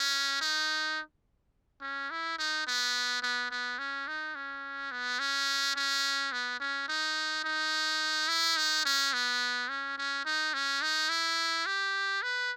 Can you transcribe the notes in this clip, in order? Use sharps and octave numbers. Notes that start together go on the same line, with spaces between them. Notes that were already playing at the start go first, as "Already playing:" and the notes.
Already playing: C#4
D#4
C#4
E4
D#4
B3
B3
B3
C#4
D#4
C#4
B3
C#4
C#4
B3
C#4
D#4
D#4
E4
D#4
C#4
B3
C#4
C#4
D#4
C#4
D#4
E4
G4
B4